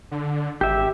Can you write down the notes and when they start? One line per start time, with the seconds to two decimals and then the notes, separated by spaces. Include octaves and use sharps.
0.11 D3
0.61 G#1 G4 E5